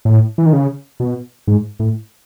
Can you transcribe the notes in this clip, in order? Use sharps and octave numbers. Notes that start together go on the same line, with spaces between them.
A2
E3
D#3
C#3
B2
G#2
A2